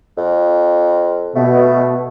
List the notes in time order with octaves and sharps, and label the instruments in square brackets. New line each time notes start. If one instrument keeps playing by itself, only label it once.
[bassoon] F2
[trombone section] B2 [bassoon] A3